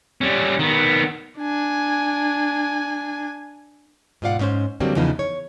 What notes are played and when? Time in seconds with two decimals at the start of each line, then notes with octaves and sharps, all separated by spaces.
0.21 G3 C#4
0.59 D#3 B3
1.39 D4 G#5
4.22 G#2 B2 F4 D5 F5 F#5
4.39 G#2 C#4 C5
4.80 D3 F#3 G3 A#3 C4
4.96 E2 C#3 E3 F3 B3 D#4
5.19 C#5